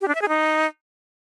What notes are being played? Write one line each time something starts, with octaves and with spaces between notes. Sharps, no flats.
G4
D4
E5
G#4
D#4